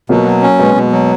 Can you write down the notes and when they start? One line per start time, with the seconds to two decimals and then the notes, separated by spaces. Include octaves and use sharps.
0.09 B2 F#3 A#3
0.26 F#3
0.42 C#4
0.59 B2 G#3 B3
0.75 B2
0.92 F#3